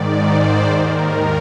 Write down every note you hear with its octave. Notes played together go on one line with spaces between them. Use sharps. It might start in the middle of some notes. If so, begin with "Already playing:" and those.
Already playing: G#2 D#3 D5
C5
D#2 D#3 A#4